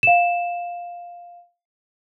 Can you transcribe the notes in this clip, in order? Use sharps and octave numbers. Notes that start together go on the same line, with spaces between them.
F5 E7